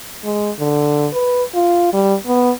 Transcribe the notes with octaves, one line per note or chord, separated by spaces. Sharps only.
G#3
D3
B4
F4
G3
B3